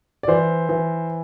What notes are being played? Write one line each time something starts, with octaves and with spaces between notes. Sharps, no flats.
D5
E3 C5
E3